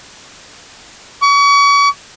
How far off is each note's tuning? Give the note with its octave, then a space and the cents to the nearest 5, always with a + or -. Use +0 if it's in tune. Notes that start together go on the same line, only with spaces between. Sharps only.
C#6 +40